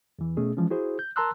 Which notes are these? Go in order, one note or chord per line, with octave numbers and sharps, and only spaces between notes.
E2 E3
B2 A3 C#4 G#4
E3 F3 G#3 C#4
E4 F#4 G#4 C5
G6
A#4 A5 A#5 C6 E6 F#6